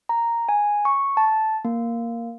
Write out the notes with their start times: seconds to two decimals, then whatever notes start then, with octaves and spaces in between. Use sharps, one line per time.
0.09 A#5
0.49 G#5
0.85 C#6
1.17 A5
1.65 A#3